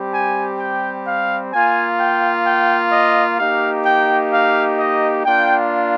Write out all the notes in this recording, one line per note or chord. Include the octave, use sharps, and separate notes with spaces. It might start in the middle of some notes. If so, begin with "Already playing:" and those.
Already playing: G3 C4 G4
G#5
G5
F5
A#3 F4 G#5
G5
G5
D#5
A#3 D#4 G4 F5
G5
F5
D#5
A#3 D4 F4 G5